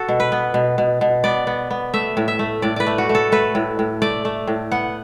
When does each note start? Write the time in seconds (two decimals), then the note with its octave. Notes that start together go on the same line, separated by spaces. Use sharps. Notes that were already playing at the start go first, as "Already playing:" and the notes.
Already playing: F#4 A4
0.09 B2
0.20 B4
0.32 B3
0.54 B2
0.78 B2
1.01 B2
1.24 B3 D5
1.47 B3
1.71 B3
1.94 A3 E5
2.17 A2
2.28 E5
2.39 A3
2.62 A2 D5
2.76 B4 D5
2.87 A3
2.98 F#4
3.09 A3
3.15 A4
3.32 A3 B4
3.55 A2
3.79 A2
4.02 A3 D5
4.25 A3
4.47 A2
4.72 B3 F#5